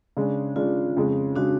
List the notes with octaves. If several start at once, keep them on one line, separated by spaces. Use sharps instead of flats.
C#3 G#3 D4
C#3 G#3 D4 F4
F2 C#3 G#3
C#3 G#3 D4 F#4